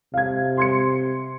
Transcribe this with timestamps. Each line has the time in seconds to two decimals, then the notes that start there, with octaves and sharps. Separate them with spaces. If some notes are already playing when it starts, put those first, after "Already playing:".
0.14 C3 F5 G#6
0.57 C6 G#6 C#7